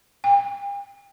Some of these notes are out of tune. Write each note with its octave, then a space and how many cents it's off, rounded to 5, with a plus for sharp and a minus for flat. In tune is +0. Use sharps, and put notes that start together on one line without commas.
G5 +40